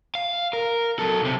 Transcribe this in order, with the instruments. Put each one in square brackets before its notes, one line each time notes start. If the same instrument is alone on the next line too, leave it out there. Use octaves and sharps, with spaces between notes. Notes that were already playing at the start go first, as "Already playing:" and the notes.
[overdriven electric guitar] F5
A#4
F#3 A4
B1 C3